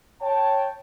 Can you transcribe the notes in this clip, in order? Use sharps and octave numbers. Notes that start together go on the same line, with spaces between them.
C#5 G5 A5